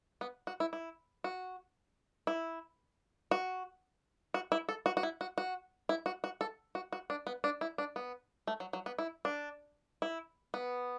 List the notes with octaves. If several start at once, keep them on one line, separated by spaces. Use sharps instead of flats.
B3
F#4
E4
E4
F#4
E4
F#4
F#4
E4
A4
F#4
F#4
E4
F#4
F#4
E4
F#4
F#4
A4
F#4
F#4
D4
B3
D4
E4
D4
B3
A3
F#3
F#3
B3
E4
D4
E4
B3